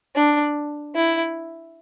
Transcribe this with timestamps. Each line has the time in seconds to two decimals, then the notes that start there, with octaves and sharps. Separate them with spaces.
0.16 D4
0.96 E4